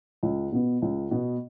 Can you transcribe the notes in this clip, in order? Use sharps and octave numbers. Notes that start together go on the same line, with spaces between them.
C#2
B2 B3
C#2
B2 B3